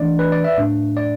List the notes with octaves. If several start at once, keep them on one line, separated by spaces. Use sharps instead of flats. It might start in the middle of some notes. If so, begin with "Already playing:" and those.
Already playing: E3 A3 D4 D5
B4
D5
E5
A2 A3 D4
D5